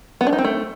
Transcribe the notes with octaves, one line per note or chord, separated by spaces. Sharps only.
B3
D4
D#4
C4
A3